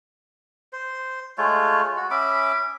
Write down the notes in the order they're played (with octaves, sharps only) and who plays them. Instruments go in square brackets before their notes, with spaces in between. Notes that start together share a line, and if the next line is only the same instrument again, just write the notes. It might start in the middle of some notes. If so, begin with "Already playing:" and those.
[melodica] C5
G#3 A3 F4 C#5
F#4
C#4 E5 B5 D6